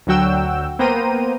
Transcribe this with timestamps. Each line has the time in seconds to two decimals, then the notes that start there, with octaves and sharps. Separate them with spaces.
0.07 D2 D3 F#3 F#4 G5 E6
0.79 A#3 B3 C5 G5 A#5 D#7